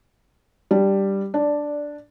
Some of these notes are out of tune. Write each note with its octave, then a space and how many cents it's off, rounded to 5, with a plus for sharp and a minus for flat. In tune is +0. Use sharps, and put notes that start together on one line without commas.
G3 +0 D4 +0
D4 +0 D5 -10